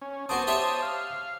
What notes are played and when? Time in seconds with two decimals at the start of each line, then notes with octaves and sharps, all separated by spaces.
0.02 C#4
0.29 B3 F#4 C5 A5 D6 D#6
0.47 G4 C#5 E5
0.82 F5